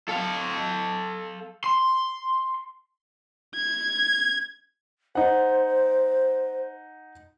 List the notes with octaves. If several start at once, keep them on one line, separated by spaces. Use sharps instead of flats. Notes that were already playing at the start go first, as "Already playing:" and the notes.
A4 F5
C6
G#6
D#4 C5 F#5